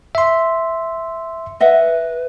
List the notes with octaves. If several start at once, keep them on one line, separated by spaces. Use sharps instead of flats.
E5 C6
B4 D#5 E5 F#5